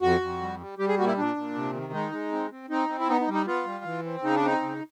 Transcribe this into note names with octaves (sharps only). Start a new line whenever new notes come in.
F2 F#4
F2
G3
G3
G3 G4
G#4
A#2 F#4
E4
A#2 D4
A#2
C3
D#3
G#3 D#4
G#3
C4
C4
C4 D#4
C4
E4
B3 D#4
D#4
G3
D#4
B3 F4
G3
E3
C4
C#3 D#4
D4
C4 D#4
C#3